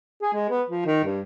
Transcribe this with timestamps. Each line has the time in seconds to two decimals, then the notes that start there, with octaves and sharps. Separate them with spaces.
0.22 G#4
0.33 G#3
0.49 B3
0.69 F3
0.85 D#3
1.04 G2